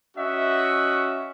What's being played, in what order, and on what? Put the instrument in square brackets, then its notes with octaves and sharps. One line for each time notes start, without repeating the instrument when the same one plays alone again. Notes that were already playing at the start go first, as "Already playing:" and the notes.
[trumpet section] C#4 F#4 D#5 E5 F#5